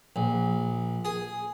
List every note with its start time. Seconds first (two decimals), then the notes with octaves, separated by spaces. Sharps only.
0.16 A#1
1.05 G#4